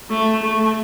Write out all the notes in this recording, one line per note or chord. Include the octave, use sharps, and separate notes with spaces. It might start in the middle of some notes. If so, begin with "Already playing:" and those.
A3
A3